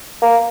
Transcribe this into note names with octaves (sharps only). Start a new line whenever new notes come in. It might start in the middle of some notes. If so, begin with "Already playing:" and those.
A#3